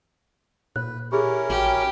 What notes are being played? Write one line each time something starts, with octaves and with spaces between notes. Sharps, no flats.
A#2 B4 F#6
C#4 E4 G4 G#4 A#4
A1 F#4 G4